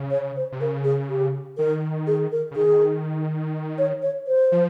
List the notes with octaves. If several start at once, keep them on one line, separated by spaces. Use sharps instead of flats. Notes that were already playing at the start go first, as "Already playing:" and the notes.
Already playing: C#3
C#5
C5
C3
C#3 A#4
G#4
G4
D#3 A#4
G#4
A#4
C#3
D#3 G#4
C#5
C#5
C5
F3